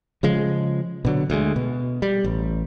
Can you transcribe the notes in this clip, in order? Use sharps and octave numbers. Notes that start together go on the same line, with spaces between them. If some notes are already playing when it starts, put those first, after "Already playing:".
C#3 F3 G#3
B2 D3 F#3
D2 G#3
B2
G3
A1